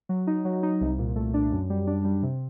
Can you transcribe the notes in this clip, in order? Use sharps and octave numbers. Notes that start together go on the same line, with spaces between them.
F#3
D#4
F#3
D#4
C2
A#2
A3
D4
F#2
G3
D4
G3
C3